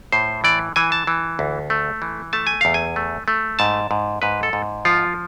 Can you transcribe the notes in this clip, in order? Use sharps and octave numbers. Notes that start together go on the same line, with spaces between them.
A2 C5
E3 D5
E3 G#5
A5
E3
D2
A3
E3
A3 A5
G#5
E2 F5
G#5
A3
A3
G#2 A5
G#2
G#2 B4
A4
G#2
F3 F4